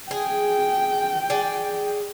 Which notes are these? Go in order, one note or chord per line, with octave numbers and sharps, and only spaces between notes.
G#4 G5
G#4 D5